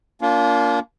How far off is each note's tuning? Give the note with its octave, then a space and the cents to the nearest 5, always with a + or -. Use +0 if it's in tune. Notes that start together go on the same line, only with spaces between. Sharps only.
A#3 +0 D4 -40 F4 +0